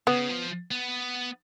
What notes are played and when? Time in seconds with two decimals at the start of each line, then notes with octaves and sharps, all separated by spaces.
0.07 C#3 B3
0.29 F3
0.71 B3